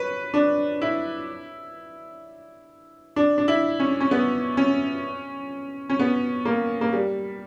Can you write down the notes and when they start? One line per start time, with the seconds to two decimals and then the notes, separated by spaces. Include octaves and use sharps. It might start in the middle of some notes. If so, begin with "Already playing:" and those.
Already playing: B4 C#5
0.34 D4
0.82 E4
3.16 D4
3.38 D4
3.48 E4
3.80 C#4
4.00 C#4
4.11 B3
4.57 C#4
5.90 C#4
6.00 B3
6.45 A#3
6.81 A#3
6.93 G3